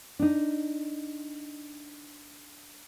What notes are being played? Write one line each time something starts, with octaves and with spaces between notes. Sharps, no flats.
D4 D#4